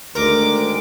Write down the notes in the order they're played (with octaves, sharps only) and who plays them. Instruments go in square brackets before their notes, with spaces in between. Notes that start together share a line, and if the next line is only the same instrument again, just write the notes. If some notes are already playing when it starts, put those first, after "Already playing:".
[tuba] D2 [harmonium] D#3 G#3 [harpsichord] A#4 [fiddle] D6